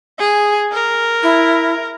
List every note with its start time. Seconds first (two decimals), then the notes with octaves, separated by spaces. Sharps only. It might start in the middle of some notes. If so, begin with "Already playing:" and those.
0.19 G#4
0.72 A#4
1.23 E4